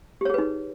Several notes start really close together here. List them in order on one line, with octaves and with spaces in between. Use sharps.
G4 C#5 G#4 B4 D#4